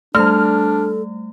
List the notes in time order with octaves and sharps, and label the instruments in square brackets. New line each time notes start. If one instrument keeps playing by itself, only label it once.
[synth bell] G3 A3 [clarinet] D4 [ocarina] A4 [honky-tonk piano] F6